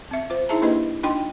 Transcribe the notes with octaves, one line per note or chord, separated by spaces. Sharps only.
C4 E5
F4 C5
D#4 E4 G#4 E5 A5 A#5
A#3 D4 E4 G4 B4 D#5
D4 D#4 F4 D#5 G5 C6